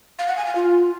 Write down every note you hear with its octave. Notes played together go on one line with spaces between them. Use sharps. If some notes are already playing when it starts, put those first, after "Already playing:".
F5
F#5
G#5
F5
F4